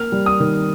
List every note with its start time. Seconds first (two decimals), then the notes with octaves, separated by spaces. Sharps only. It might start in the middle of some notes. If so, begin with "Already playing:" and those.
Already playing: A#3 F6
0.12 G3
0.26 D#6
0.40 D#3